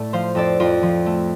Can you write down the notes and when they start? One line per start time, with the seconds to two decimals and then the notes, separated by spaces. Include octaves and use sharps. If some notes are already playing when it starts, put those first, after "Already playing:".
Already playing: A2 A3 D5
0.13 F3 C5 F5
0.35 F2 A4 D5
0.60 F2 F4
0.83 F3
1.06 A3